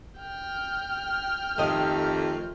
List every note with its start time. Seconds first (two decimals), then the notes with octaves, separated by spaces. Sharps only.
0.21 G5 F6
1.58 F2 D#3 F3 A3 G4 D#5